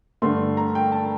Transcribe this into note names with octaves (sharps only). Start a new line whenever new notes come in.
G2 D3 A3 C6
A#5
G5
A5